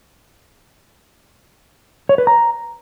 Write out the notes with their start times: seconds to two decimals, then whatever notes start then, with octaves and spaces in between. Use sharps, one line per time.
2.09 C#5
2.18 B4
2.27 A#5